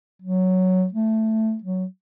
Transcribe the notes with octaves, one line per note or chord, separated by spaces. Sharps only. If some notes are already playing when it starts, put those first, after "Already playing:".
F#3
A3
F#3